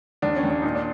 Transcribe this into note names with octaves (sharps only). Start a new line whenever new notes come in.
D#2 D4
C#4
D#2
D4
A#2 D#4
D4